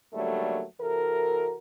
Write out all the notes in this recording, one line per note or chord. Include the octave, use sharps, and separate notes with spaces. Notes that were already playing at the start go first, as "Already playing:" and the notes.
G#2 D3 F#3 G3 A3 A#3
C3 E3 F#4 A4 A#4